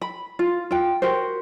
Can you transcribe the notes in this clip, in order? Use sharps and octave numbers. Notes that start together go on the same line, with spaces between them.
B5
F4
F4 G5
F#4 G4 A#4 C5